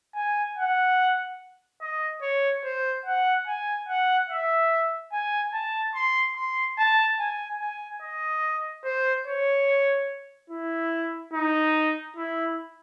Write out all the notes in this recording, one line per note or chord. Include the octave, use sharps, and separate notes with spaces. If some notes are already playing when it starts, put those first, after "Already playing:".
G#5
F#5
D#5
C#5
C5
F#5
G#5
F#5
E5
G#5
A5
C6
C6
A5
G#5
G#5
D#5
C5
C#5
E4
D#4
E4